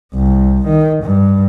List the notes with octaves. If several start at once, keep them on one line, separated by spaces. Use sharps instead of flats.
C2
D#3
G2